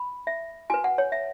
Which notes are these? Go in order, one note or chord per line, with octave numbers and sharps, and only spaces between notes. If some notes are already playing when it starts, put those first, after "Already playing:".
Already playing: B5
E5
F#4 B4 G#5
F#5
C#5
E5